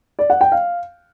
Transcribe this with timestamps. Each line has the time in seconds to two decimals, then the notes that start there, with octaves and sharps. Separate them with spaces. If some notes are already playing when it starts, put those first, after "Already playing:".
0.19 D5
0.30 F#5
0.41 G5
0.52 F5